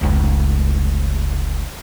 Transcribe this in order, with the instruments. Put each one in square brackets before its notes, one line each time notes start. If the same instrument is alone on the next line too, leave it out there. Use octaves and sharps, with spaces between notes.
[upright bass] F1 C#2